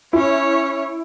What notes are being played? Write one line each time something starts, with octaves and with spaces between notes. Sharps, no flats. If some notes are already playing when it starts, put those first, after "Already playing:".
C#4 E4 C#5